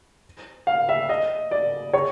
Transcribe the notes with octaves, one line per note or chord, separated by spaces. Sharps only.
F5
E5
D#5
D5
C#5